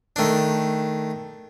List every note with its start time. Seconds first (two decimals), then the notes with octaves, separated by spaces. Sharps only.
0.16 D#3 A3 D4